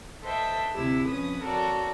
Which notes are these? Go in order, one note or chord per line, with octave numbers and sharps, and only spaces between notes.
A4 B4 C5 D#5 E5 G5
D2 C3 E4 G4 E6
F2 F3 C#4 B4 D#6
F#4 A4 A#4 C#5 D5